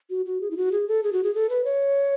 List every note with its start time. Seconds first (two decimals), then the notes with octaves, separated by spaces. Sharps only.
0.10 F#4
0.26 F#4
0.41 G#4
0.51 E4
0.57 F#4
0.72 G#4
0.88 A4
1.03 G#4
1.13 F#4
1.24 G#4
1.34 A4
1.49 B4
1.64 C#5